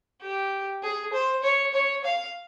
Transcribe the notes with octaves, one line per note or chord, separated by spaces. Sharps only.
G4
G#4
C5
C#5
C#5
F5